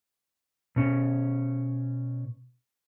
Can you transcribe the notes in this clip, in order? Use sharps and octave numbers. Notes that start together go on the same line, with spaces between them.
B2 C#4